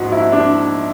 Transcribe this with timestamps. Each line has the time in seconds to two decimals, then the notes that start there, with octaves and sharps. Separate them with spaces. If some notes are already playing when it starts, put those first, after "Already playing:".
Already playing: A#1 G#2 F#4
0.12 E4
0.32 D4